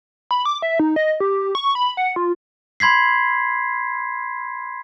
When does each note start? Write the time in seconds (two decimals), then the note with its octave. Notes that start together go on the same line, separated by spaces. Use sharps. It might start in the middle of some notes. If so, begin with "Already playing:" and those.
0.31 B5
0.46 D6
0.62 E5
0.79 D#4
0.96 D#5
1.20 G4
1.55 C#6
1.75 B5
1.97 F#5
2.16 F4
2.80 B5 C6 G#6 B6 C7